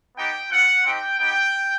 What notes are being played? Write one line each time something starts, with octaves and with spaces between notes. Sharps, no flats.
B3 D#4 G4 G5
C4 F4 F#5
C4 D#4 G4 G5
B3 D#4 G4 G5